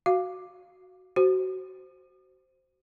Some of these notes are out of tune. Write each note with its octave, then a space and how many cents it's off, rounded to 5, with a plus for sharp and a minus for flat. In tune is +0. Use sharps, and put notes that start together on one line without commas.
F#4 +0 F5 +5
F#4 +20 C5 +0